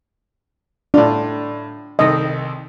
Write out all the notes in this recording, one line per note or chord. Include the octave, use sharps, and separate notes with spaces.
A2 D4 F4
C2 D#3 A4 D#5